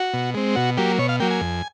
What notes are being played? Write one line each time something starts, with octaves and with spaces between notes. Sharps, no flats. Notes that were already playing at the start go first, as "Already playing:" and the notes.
Already playing: F#4
B2
G#3 C4
B2 F#4
F#3 A#3 G4
B2 C#5
F5
F#3 A#3 G5
G#5
F2